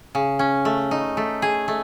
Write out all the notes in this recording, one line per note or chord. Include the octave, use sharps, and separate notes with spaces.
C#3
C#4
A3
D#4
A3
G#4
A3